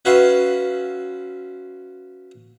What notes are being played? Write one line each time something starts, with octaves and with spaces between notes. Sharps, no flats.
C#4 F#4 B4 E5 F5 C6